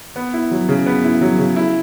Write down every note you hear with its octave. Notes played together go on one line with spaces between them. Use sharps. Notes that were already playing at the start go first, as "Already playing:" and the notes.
B3
E4
F#3
C#3
B3
E4
F#3
C#3
E4